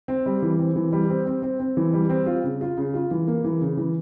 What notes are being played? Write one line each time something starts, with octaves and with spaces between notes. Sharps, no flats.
C4
G3
E3
C4
E3
G3
C4
C4
C4
C4
E3
G3
C4
F4
C#3
F4
C#3
F4
E3
A#3
E3
C#3
E3